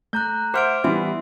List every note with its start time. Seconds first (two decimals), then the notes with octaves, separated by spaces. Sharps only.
0.13 A3 A#5 F#6 G6
0.54 C5 E5 F#5 D6 F6 D7
0.84 E3 G3 B3 E5 C6